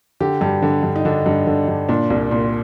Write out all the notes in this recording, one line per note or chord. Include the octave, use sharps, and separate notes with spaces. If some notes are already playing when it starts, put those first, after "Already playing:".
D3 G4
G2 G4
D3
G2
D#4
D3 D4
G2
D3
G2
A#2 D4
C2
A#2